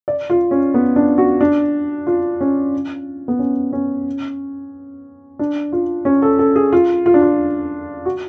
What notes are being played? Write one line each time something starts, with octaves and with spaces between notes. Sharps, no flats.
D5
F4
C#4
B3
D4
F#4
D4
F4
C#4
B3
C#4
C#4
D4
F4
C#4
A4
A4
G#4
F4
F4
D4
F4
F#4